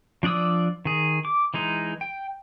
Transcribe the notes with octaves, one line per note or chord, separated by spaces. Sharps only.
F3 D4 D5 D#6 E6
D#3 G#4
D6
E3 G#3 D#4
G5